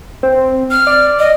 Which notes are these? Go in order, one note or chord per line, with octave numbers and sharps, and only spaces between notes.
C4
F6
D5
D#5